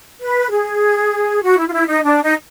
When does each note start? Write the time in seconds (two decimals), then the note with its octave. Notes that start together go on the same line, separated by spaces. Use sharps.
0.21 B4
0.51 G#4
1.43 F#4
1.58 E4
1.67 F4
1.73 E4
1.87 D#4
2.04 D4
2.23 D#4